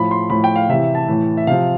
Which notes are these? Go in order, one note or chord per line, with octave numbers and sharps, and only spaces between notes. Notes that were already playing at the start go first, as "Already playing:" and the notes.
Already playing: A2 F3 B5
C6
A2 F3 B5
G5
F5
C3 E3 E5
A5
A2 E3
E5
C3 F3 F5